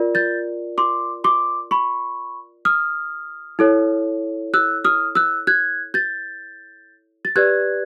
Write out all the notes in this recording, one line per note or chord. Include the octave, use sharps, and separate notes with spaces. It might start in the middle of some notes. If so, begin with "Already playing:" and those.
Already playing: F4 A#4 D5
G6 A6
C6 D6
C6 D6
B5 C#6
D#6 F6
E4 A4 C#5
E6 F#6
D#6 F6
E6 F#6
F#6 G#6
G6 A6
A6
G4 B4 D5 F#6 G#6